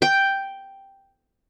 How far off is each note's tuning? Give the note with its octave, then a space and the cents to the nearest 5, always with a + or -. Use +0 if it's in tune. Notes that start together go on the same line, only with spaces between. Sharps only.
G5 +0